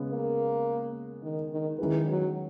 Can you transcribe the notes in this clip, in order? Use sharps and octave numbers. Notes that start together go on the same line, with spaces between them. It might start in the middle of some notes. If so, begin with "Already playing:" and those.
Already playing: C#3 G#3 B3
A#3
D#3
D#3
D#3 E3 G#3 C#4 G#4 B4
F#3